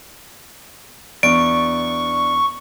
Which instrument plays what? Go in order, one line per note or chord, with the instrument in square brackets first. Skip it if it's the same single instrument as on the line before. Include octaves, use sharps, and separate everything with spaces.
[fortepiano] E2 [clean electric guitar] D4 D5 [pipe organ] C#6 [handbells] D7